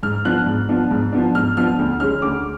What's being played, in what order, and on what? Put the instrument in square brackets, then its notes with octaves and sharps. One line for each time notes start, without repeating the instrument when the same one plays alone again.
[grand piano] G#2 F6
F3 B3 D4 F#6
G#2
F3 B3 D4
G#2
F3 B3 D4
G#2 F6
F3 B3 D4 F6
D2
C#3 G#3 C#4 F6
D2 D6